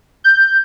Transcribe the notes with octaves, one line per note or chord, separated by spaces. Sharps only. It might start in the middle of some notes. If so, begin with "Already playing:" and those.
G6